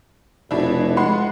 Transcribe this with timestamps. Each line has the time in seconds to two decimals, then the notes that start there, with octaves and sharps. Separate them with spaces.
0.51 F1 B2 D4 E4
0.97 G#3 F#5 C6